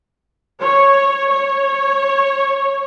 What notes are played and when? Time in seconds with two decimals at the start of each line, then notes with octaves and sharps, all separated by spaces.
0.61 C#5
1.31 C#5